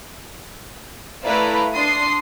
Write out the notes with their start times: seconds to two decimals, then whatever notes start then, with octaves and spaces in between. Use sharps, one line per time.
1.24 A3 E4 B4 D5 F5 A#5
1.73 D4 C6 D#6 C7